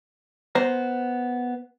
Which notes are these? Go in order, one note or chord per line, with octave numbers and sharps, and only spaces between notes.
B3 C5 A#5